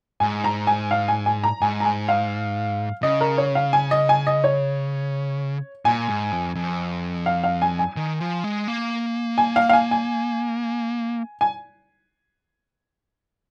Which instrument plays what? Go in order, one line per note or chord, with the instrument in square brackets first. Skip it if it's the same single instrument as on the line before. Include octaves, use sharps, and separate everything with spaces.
[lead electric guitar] G#2 [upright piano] G#5
[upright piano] A#5
G#5
F5
G#5
G#5
A#5
[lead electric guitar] G#2 [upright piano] G#5
[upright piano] A#5
G#5
F5
[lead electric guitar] C#3 [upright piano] D#5
[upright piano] A#4
C#5
F5
G#5
D#5
G#5
D#5
C#5
[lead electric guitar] A#2 [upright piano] G#5
[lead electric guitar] G#2
F2
F2
[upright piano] F5
F5
G#5
G#5
[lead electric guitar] D#3
F3
G#3
A#3
[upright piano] G#5
F5
F5
G#5
G#5
G#5